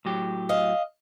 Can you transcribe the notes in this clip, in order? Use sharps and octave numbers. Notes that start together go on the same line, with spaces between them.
A2 F#3 G4
D#5 F5